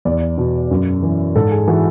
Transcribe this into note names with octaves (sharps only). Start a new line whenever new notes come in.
E2 D5
B2
F#2
E3
G#2 A4
G#4
E3 F#4